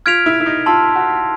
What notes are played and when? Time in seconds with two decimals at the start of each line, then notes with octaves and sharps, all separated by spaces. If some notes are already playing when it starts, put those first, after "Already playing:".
0.06 F4 F6 G#6 B6 D7 F7
0.26 E4
0.40 E4
0.46 D#4
0.66 F4 A5 C6 E6
0.96 F#4